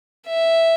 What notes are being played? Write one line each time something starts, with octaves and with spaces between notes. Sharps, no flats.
E5